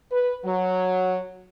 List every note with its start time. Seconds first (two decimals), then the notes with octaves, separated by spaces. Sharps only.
0.12 B4
0.45 F#3